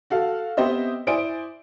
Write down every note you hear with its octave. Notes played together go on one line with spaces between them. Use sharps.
F#4 A4 F5
B3 C4 G4 C5 D#5 E5
E4 C5 D5 G#5 D#6 D7